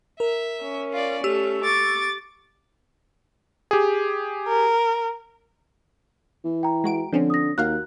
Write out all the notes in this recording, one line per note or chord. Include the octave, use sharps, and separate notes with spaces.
A#4 E5
C#4
F4 D5
A3 G4 E6
C#6 D6 A6
G4 G#4
A#4
E3
G5 A#5
G#3 F#4 D7
D3 F3 C4 C#4
D#6 A#6
D#2 F#4 A#4 F5 F#6